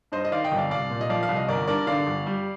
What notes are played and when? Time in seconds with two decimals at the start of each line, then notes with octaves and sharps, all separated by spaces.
0.12 G2 C5 D#5
0.25 D#5
0.31 D#3 D5 F5
0.44 D#5 G5
0.52 G1
0.57 D5 F5
0.70 C2 D5 F5
0.90 A#2
1.01 D#5
1.09 F3 D5 F5
1.23 F5
1.29 C2
1.36 D#5
1.49 G1 A#4 D5
1.67 G2 A#4 D5
1.87 D3 D5 F5
2.07 G1
2.27 G3